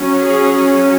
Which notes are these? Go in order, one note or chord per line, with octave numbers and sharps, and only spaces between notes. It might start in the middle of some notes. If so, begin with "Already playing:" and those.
Already playing: F#3 C#4
G#4